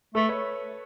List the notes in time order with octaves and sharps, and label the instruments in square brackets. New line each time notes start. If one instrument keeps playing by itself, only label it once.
[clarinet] A3 [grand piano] A4 B4
[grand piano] B4 C#5